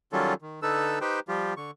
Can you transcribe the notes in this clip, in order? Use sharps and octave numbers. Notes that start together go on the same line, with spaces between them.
D#3 F#3 G3 C#4 F4 A4
D#3
D3 D#4 A4 B4 E6
D#4 G4 B4 C5 G5
F3 G3 F4 G4
D3 C#6